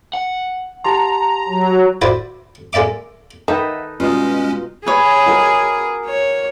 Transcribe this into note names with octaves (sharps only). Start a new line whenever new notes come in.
F#5
G4 A5 A#5 C6
F#3
E4 F#4 B4 C5 D5
G#3 A#3 D5 E5 D6
D#3 D#4 A4 B4 D#5 E5 F#5
G2 B2 G#3 C#4 D#4 F4
G#4 B4 C#5
F#4 A#4 D6
C#5